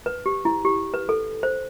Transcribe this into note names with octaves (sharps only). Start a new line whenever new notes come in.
B4
G4
E4
G4
B4
A4
C5